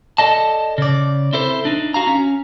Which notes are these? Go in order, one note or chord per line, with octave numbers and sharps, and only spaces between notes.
A4 D5 D#5 A5
C#3 D5
C4 E4 A4 C5
D4 D#4
F#4 F5 A#5
C#4